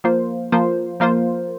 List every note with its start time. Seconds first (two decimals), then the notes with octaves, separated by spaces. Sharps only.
0.04 F3 A#3 F4 C5
0.52 F3 A#3 F4 C5
1.00 F3 A#3 F4 C5